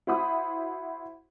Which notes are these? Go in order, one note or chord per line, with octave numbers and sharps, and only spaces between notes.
E4 F#4 C5 F#5 B5 D#6